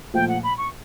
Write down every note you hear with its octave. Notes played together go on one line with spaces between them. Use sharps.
A#2 F3 A3 G5
F#5
B5
C#6